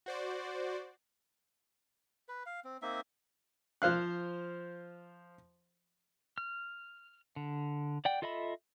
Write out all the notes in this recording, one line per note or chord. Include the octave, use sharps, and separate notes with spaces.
F#4 C5 D5
B4
F5
C4
A#3 C4 D#4 E5
F3 C5 F5 F#6
F6
D3
D5 F#5 G5
F4 A4 D#5 E5 B5